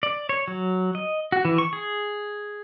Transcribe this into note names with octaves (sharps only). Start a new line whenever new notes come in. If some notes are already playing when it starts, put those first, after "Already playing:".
D5
C#5
F#3
D#5
F#4
E3
C#6
G#4